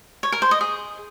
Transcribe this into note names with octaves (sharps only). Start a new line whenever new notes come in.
C#5
A#4
C5
D#5
G#4